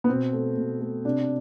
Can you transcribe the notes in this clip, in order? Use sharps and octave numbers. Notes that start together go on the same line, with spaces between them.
B3
B2 C4
A3
B2
A3
C3 D4